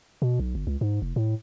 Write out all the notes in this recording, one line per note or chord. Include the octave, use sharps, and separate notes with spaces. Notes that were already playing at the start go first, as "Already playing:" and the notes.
B2
B1
G1
C#2
G#2
F1
A2